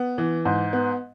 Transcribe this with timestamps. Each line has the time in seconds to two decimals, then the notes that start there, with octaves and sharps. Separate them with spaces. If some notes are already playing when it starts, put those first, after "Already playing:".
Already playing: B3
0.18 E3
0.45 G#2
0.73 B3